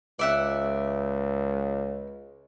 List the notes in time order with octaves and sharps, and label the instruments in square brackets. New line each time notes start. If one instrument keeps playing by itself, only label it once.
[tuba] C#2 [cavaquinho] D5 E5 F#5